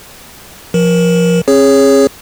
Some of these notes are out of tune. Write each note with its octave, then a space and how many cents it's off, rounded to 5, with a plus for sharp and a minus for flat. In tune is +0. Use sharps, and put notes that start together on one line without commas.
F3 +0 A#4 +25
C#4 -45 G#4 -10 C#5 +5